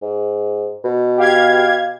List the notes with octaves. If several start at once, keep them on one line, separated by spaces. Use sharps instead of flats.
G#2
B2
G4 F5 G#6